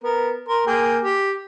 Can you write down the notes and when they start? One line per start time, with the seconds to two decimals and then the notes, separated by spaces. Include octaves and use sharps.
0.03 B3 A#4
0.49 A#4 C6
0.67 A#3 G#4 G5
1.03 G4